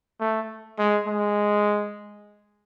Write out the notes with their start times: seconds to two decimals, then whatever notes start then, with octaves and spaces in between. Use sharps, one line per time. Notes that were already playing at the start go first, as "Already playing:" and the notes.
0.20 A3
0.78 G#3
1.06 G#3